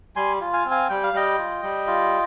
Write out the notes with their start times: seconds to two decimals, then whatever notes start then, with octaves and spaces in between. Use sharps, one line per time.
0.16 G3 G#5 C6
0.41 F4
0.53 F5 G#5
0.65 C4
0.71 F5 G#5
0.89 G3 G5
1.03 F5
1.13 G3 D#5 G5
1.38 F4
1.63 G3
1.87 F4